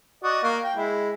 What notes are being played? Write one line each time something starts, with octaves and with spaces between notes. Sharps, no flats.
F#4 D5 D#5
A#3
G5
G#3 E4